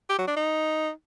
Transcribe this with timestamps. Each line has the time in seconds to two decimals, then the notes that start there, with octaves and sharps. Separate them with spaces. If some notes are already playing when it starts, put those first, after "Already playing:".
0.09 G4
0.18 F#3
0.27 D4
0.36 D#4